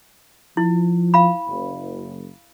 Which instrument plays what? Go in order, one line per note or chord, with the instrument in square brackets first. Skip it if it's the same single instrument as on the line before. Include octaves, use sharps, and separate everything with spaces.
[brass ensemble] F3 [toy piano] E4
[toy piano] F5 B5
[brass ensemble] F#1